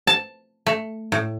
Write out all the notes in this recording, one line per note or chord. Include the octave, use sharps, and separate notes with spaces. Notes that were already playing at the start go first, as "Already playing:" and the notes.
A5
A3
A2